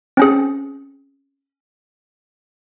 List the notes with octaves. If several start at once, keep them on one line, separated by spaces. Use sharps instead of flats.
C4 C#4 G#4